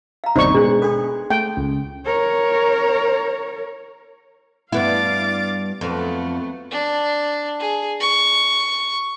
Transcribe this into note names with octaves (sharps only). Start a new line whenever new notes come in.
F5 A#5
G1 D#2 C3 D#4 F#4 C5 D5 C#6
B2 G#3 D4 F#5
D4 G#4 A4 B4
A3 G5
C#2
A#4 C#5
G2 B3 E4 F5 D6 A6
F2 F#3 A3 B3
D4
G#4
C#6